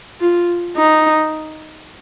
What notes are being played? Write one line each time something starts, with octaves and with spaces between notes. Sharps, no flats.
F4
D#4